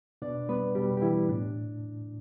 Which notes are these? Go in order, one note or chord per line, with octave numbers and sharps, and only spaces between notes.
B2 D4 D5
G3 B3 B4
B2 G3 G4
G4
E3 G3 E4
A2 D4